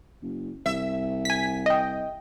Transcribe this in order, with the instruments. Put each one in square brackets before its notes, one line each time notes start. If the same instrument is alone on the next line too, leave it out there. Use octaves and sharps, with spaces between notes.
[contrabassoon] F#1
[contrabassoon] C2 [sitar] E5
[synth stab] G#5 B6
D#5 G5